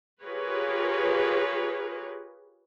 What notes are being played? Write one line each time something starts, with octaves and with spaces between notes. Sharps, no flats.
F4 G4 G#4 A#4 B4 C#5